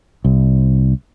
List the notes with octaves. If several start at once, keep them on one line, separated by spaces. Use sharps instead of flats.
C2